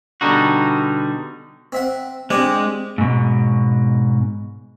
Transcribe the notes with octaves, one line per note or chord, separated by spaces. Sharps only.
B2 D3 G3 D#4 F#4
C4 E5 F#5
G#3 C4 D4 G4
G#2 B2